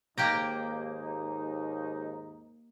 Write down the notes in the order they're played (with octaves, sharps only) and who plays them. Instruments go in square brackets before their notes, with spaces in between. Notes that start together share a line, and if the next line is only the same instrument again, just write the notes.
[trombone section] D#2 G#2 D#4 [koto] A#3 G4 A#5